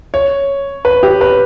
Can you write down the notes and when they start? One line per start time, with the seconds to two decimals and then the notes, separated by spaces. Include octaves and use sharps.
0.14 C#5
0.85 B4
1.03 G4
1.21 B4